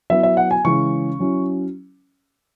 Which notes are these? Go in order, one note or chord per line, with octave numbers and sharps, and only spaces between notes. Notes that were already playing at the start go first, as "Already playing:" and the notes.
F#3 B3 E4 E5
E5
F#5
G#5
C#3 E3 G#3 C#4 C#6
F#3 C#4 E4